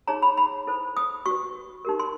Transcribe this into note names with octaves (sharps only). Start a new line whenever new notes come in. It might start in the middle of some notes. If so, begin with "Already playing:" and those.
D#4 G#4 C#5 A#5
B5
B5
E4 A4 C5
D#6
F#4 C#6
B4
D#4 G4 A#4
C6